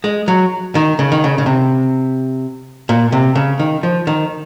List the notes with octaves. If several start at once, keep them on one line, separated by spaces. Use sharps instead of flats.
G#3
F#3
D#3
C#3
D#3
C#3
C#3
C3
A#2
C3
C#3
D#3
F3
D#3